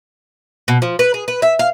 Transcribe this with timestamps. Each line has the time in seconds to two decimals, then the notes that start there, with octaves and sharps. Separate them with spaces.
0.68 B2
0.82 F3
0.99 B4
1.14 G#4
1.28 B4
1.42 E5
1.59 F5